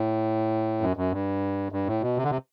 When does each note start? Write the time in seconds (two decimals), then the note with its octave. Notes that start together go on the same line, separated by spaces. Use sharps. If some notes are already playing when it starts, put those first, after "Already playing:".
Already playing: A2
0.81 F#2
0.97 F#2
1.12 G2
1.72 G2
1.87 A2
2.02 B2
2.17 C3
2.24 D3
2.31 C3